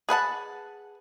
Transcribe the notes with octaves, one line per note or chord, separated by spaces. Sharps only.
G#4 B4 F#5 A5